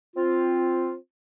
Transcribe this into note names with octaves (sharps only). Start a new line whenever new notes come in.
C4 F4